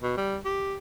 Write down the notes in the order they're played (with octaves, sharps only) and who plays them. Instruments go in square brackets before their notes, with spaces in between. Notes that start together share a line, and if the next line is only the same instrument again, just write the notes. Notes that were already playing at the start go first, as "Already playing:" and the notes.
[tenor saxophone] B2
G3
G4